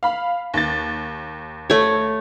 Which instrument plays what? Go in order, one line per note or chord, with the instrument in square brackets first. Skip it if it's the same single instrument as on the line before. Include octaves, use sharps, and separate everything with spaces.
[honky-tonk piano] F5 B5
D#2 A6
[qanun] A3 C#5